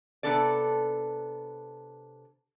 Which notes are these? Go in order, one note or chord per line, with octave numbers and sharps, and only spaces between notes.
C3 B3 D4 A4 D5